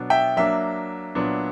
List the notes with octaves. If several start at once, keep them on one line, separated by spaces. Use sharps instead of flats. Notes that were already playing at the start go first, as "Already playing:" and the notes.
Already playing: B2 F#3 B3 D4
E5 G5
F#3 A#3 D4 E5
A#2 F#3 B3 D4